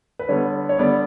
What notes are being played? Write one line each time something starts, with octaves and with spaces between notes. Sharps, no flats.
B4
D3 G3 B3 C#5
C#5
D3 G3 B3 D5